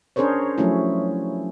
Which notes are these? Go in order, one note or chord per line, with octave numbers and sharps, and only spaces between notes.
C#4 D4 G#4 A#4 C5 C#5
F3 F#3 A3 C#4 E4